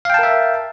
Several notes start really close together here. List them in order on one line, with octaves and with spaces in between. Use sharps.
F5 G5 A5 A#4 E5